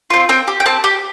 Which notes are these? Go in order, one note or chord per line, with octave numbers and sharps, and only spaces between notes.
C4 F4
C4 G5
G4
G5
C4 A5
G4